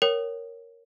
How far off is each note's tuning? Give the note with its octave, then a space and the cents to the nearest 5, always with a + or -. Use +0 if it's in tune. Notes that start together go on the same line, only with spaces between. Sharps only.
A#4 +0 C#5 +0 G5 -25